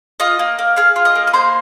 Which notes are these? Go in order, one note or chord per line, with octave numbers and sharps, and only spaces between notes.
F4 D#5 D#6
A#3
A#3
G#4 F5 F6
F4
D#5 D#6
A#3
D#6
A#3 C5 C6